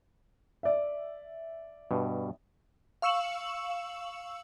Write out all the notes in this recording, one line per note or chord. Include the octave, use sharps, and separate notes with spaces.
D5 E5
G2 B2
F5 C#6 E6 C#7 E7 F#7